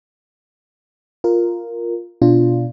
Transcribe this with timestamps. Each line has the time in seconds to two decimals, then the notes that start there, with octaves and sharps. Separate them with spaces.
1.24 F4 A#4
2.22 B2 D4 F4